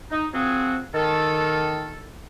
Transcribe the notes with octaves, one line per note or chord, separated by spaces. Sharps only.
D#4
F3 C4 F#4 G#4
D#3 A4